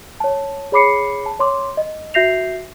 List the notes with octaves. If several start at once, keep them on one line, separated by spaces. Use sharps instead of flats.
C#5 A5
G#4 C#5 B5 D6 C7 C#7
A5
C#5 C6 D6
D#5
F#4 E5 G6 A#6 C7 F7